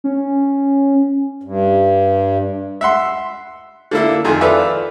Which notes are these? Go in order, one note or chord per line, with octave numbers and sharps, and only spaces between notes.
C#4
G2
E5 F#5 C6
D3 A#3 E4
F2 D#3 G#5
F4 A4 B4 D5 E5